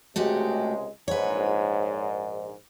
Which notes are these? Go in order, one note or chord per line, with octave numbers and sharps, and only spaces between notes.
C#2 C3 G#3 A3 F#4 G4
A#1 G#2 B4 C#5